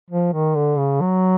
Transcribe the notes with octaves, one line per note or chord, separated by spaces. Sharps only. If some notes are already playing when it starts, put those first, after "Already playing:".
F3
D#3
D3
C#3
F#3